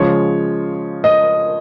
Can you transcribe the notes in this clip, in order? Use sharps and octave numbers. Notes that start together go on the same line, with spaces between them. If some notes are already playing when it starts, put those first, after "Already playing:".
Already playing: C#3 F3 G#3 C#5
D#5